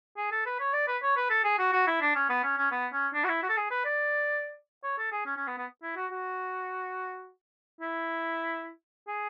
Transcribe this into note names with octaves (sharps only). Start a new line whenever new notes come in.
G#4
A4
B4
C#5
D5
B4
C#5
B4
A4
G#4
F#4
F#4
E4
D4
C#4
B3
C#4
C#4
B3
C#4
D4
F#4
E4
F#4
A4
G#4
B4
D5
C#5
A4
G#4
C#4
C#4
B3
B3
E4
F#4
F#4
E4
G#4